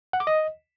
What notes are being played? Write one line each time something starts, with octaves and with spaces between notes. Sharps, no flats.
F#5
D6
D#5